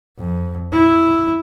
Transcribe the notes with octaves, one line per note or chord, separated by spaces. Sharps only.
F2
E4